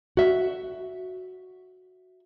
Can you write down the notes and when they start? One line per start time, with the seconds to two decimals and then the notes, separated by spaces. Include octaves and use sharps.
0.17 F#4 E5